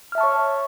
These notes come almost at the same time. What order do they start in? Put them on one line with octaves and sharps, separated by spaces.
F6 E5 A5 C#6 C#5